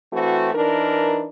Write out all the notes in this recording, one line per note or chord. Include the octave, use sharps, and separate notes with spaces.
E3 A3 C4 F#4
E3 D4 D#4 A#4